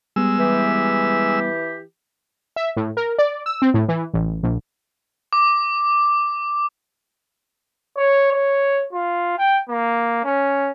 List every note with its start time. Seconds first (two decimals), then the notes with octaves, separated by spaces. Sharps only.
0.16 G3 G#3 B3 E6
0.39 E3 G4
2.56 E5
2.77 A2
2.97 A#4
3.18 D5
3.46 E6
3.62 C4
3.74 A2
3.89 E3
4.14 A1
4.43 A#1
5.33 D6
7.97 C#5
8.32 C#5
8.93 F4
9.38 G5
9.69 A#3
10.24 C#4